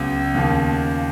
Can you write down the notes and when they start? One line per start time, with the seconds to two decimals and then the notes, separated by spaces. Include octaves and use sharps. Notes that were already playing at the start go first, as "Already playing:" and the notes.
Already playing: C#2 C#3 F#3 B3
0.34 D#2 C#3 F3